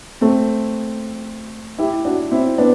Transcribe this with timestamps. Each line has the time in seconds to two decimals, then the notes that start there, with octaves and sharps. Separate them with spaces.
0.21 A3 C4
1.78 E4 G4
2.05 D4 F#4
2.31 C4 E4
2.58 B3 D4